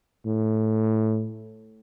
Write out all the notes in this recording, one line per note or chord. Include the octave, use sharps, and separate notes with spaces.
A2